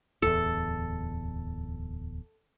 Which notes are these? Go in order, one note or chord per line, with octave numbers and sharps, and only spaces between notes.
D1 E2 A4